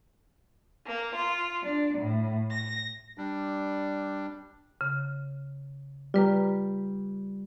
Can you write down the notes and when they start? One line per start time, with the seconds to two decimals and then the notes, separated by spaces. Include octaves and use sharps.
0.86 A#3
1.15 F4
1.63 D4
1.99 A2
2.49 A#6
3.18 G3 D4
4.81 C#3
6.14 G3 F4 B4 A#5